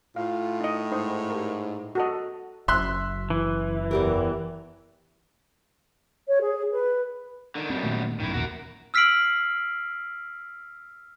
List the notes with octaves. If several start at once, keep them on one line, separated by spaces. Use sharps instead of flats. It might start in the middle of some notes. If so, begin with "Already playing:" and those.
A2 F4 F5
D#4 D#5
G#2 D#4 C5 D#5
G4 A#4
F#4 A4 D#5
F#1 F#2 E5 C6 F#6
E3
E2 G4 A#4
C#5
G#4
B4
D3 D#3
F#2 B2 G3 C4
A#2 D#3 A3
A1 F#2 B2 D#3 E4
E1 A#1 D#2 F#4 A#4
E6 F6 B6 C7 D7 F#7